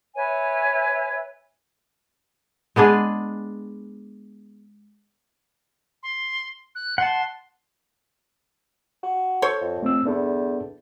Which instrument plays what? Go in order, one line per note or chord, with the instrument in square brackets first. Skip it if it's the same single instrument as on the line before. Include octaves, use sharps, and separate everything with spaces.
[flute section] B4 C#5 E5 G#5
[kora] G#3 B3 D4 G#4
[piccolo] C6
F#6
[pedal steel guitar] F#5 A5 [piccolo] C6
[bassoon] F#4
[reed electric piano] A4 [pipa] C5 C#5
[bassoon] F2
[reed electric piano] A3 C4 E6
[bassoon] E2 [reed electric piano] B3 D4 A4